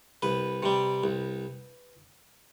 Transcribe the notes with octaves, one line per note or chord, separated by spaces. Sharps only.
C2 B4
C3 G3
C2